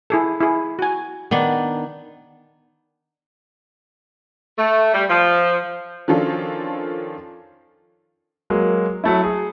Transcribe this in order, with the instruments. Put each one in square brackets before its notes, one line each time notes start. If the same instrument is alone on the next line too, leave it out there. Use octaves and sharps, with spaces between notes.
[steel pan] E4 G#4 A4
E4 G#4
F#4 G#5
[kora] D#3 B3 D4
[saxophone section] A3
G3
F3
[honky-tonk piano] D#3 F3 C#4 D4 F4 A4
[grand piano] F#3 G#3 A#3
F#3 A3 E4
G#4